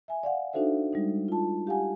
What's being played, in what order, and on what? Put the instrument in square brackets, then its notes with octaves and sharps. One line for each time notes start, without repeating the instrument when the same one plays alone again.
[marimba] E5 G#5
D5 F5 F#5
D4 D#4 F#4 A4 C5 E5
G3 G#3 D#4
F4 A5
G4 F5 F#5 G#5